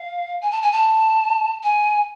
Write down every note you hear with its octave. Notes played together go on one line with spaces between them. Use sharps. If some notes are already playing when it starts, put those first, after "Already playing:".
Already playing: F5
G#5
A5
G#5
A5
G#5